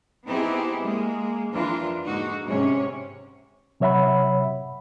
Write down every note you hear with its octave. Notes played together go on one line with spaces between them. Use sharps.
B3 C4 D#4 E4 G4 G#4
G#3 A#3
F2 E3 D4 F4 A#4
G#2 D3 G#3 A#3 D#4 F#4
G#2 C3 C#4 C#5
C3 F#3 C#5 E5 F#5 B5